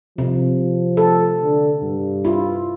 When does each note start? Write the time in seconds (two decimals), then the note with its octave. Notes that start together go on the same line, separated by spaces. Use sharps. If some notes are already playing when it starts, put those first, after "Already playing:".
0.18 C3 F3
0.97 A4
1.42 D3
1.83 G2
2.25 E4 F4